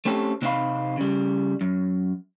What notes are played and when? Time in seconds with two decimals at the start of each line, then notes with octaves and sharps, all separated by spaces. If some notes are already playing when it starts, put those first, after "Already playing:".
0.05 A3 C4 C#4 G4 A4
0.42 C3 C4 D#4 F4 F5 B5
0.97 C#3 G3
1.61 F#2